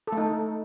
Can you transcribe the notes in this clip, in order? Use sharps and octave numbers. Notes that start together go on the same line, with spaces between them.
A3 D#4 A4